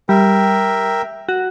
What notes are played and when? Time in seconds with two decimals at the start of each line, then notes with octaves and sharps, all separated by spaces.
0.09 G3 A#4 E5 G5
1.29 F#4